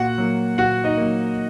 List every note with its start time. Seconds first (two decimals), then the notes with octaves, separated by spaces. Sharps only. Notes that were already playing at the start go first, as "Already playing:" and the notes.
Already playing: A#2 F#4 F#5
0.18 F#3 A#3
0.58 A#2 F#4 F#5
0.84 D#4 D#5
0.98 F#3 A#3